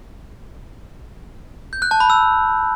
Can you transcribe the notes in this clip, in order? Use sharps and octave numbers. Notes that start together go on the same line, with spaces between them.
G6
F#6
A5
B5
E6